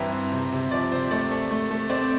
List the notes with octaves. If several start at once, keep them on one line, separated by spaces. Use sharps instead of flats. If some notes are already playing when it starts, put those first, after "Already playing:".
Already playing: G2 E3 C4 E5 G5 A#5
C4
C3
C3
F3 D5
C3 C5
A3 D5
A3
A3
A3
C4 D5